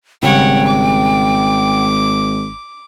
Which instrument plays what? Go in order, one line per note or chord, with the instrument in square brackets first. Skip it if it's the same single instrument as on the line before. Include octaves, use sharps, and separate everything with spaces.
[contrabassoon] G#1 [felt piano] C#3 G3 [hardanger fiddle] C#5 F#5 [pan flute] G5
[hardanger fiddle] D6